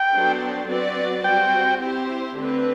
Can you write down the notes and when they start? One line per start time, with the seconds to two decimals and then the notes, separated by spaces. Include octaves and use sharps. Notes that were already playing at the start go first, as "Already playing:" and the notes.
Already playing: G5
0.13 F#3 B3 D4 A4 C5
0.68 F#3 C4 F#4 B4 D5
1.23 G3 C4 F#4 C5 G5
1.80 C4 E4 G4 C5
2.35 D3 A3 C4 G4 B4